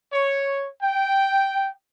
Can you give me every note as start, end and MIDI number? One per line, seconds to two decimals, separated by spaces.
0.12 0.68 73
0.82 1.71 79